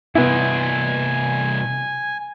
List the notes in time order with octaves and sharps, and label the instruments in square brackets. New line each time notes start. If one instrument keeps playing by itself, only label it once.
[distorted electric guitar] G2 C3 [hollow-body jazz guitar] B3 E4 [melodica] G#5